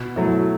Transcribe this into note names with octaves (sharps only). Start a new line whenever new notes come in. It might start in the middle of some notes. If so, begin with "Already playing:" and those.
Already playing: B2
F#3 A3 E4